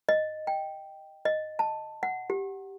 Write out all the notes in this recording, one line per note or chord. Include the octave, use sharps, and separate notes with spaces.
D#5
G5
D#5
A5
F#5
G4